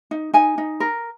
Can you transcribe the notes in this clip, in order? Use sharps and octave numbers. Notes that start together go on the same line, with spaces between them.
D#4
D#4 G#5
D#4
A#4